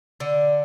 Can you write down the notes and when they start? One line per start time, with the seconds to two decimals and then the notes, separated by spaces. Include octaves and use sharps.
0.20 D3